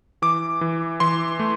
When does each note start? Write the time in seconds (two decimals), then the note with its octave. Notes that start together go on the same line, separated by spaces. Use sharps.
0.22 E3 D6
0.61 E3
1.00 E3 C6
1.40 A3